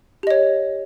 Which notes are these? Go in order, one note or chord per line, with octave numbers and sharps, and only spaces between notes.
G4 C#5 D#5